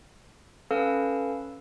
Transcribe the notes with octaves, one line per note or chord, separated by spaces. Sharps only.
C#4 A4 B4 F5 E6